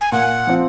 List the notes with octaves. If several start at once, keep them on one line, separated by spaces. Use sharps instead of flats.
G#5
A#2 F#5
F3 C4 F4